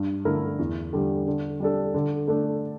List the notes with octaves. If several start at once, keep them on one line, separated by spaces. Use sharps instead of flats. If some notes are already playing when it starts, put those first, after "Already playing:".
Already playing: G2
D3 A3 E4 A#4
E2
D3 G3
D3
G3 D4 A4
D3
A3 D4 A4